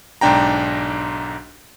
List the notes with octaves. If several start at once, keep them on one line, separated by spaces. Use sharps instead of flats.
B1 G#2 D4 G5 A#5